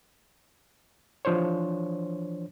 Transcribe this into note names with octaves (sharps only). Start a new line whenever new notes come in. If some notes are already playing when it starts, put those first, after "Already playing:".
E3 F3 D4 C5 C#5